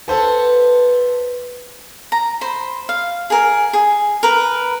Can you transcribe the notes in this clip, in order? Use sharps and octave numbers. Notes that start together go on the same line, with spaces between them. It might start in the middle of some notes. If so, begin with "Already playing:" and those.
B3 A4 C5 A5
A#5
C5 B5
F5
G#4 A#4
G#4
A#4 B4